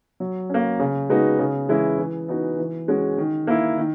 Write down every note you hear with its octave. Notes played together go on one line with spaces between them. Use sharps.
F#3
A#3 C#4
C#3
G#3 B3 D#4 F#4
C#3
E3 G#3 C#4 E4
E3
B3 D#4 F#4
E3
G#3 C#4 F#4
D#3
A#3 E4
D#3